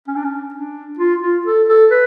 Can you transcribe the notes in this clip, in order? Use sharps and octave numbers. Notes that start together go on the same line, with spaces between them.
C#4
D4
C#4
D4
F4
F4
A4
A4
B4